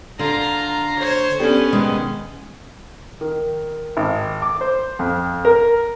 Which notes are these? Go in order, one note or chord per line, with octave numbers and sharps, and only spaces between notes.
D3 F4 A#5
C5 C#5
B3 C#4 D4 G4 A4
B2 D#3 G#3
D#3
G#1
D6
C5
F2
A#4